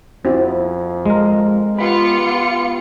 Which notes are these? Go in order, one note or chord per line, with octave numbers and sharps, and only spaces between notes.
F2 C4 E4 F#4
G#3 A#4
B3 F4 G4 B5 C#7